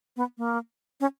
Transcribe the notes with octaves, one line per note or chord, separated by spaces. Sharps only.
B3
A#3
C#4